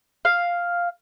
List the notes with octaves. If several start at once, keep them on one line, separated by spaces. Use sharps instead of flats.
F5